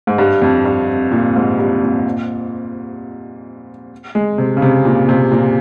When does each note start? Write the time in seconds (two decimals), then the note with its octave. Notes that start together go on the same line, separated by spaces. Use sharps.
0.07 G#2
0.18 G2
0.42 F2
0.65 G2
1.12 A#2
1.35 G#2
1.59 G2
1.82 A#2
4.15 G#3
4.38 C3
4.57 C#3
4.62 C3
4.85 A#2
5.09 C3
5.32 A#2